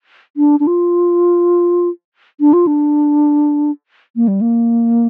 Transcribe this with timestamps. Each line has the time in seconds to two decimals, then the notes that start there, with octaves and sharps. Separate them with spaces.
0.37 D4
0.60 D4
0.67 F4
2.40 D4
2.53 F4
2.67 D4
4.16 A#3
4.28 G3
4.41 A#3